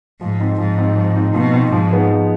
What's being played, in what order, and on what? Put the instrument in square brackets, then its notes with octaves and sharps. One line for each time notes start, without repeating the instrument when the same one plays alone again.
[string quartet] G#2 [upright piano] F3
[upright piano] C4 D#4
[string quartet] G#2 [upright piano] F3
[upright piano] C4 D#4
F3
C4 D#4
[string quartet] B2 [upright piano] F3
[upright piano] C4 D#4
[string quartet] G#2 [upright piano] F3
[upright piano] G#3 B3 D#4
F3